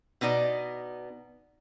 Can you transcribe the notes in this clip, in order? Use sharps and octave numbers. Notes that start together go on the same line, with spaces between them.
B2 B3 D#4 D5